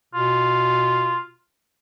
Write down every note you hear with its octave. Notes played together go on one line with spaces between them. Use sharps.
B2 F4